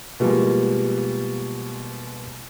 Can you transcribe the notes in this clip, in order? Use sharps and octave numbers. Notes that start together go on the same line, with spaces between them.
B2 F3 G3 G#3 A#3